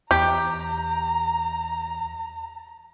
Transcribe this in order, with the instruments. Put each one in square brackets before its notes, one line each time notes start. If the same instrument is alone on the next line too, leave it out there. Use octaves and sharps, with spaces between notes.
[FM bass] E2 [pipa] G4 [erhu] A#5